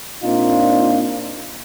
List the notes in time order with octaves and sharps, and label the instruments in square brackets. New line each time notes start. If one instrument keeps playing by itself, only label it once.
[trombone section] A#2 C4 D4 D#4 F4